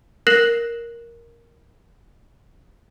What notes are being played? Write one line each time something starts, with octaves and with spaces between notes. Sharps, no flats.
A#4 F#6 A#6 C7 E7 F#7